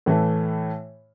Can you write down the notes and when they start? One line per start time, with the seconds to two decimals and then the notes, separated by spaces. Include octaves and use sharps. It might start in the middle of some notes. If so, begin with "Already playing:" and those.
0.06 A2 E3 A3